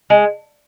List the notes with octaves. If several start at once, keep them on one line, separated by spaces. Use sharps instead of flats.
G#3